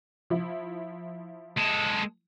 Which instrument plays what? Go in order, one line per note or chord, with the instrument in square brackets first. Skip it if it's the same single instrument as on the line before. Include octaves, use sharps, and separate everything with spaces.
[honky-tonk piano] F3 E4
[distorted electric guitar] G#3 A4